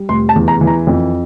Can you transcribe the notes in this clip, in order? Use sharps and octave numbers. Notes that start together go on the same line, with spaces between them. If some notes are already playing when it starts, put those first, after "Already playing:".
Already playing: G3
F1 C6
A5
E2
A#5
E3
A#5
F2